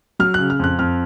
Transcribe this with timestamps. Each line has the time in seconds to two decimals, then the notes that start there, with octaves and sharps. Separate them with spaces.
0.19 F#3 F6
0.34 F#6
0.39 C#3
0.50 F6
0.60 F2 F#6
0.79 F2 F6